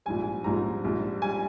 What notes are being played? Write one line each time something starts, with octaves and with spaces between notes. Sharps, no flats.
A#1 G#2 G3 G#5
A#1 G#2 G3 A#5
A#1 G#2 G3
G3 G#5